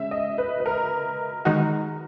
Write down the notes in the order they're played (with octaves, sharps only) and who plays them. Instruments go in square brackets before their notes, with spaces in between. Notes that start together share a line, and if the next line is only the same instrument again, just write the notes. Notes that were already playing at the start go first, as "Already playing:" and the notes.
Already playing: [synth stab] C#3 G#3 [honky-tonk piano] E5
[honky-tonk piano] D#5
B4
B4
A#4
[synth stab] D#3 G#3 D#4 F#4